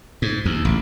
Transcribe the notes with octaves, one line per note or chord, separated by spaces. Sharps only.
G#2
D#2
A1